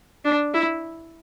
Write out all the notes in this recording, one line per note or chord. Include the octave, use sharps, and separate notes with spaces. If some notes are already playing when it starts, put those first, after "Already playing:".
D4
E4